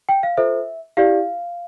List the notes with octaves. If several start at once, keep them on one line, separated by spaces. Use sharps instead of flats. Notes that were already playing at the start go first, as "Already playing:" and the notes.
G5
F5
F4 A4 C5 E5
E4 G4 D5 F5